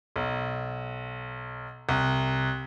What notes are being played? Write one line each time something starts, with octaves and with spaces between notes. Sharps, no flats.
B1
C2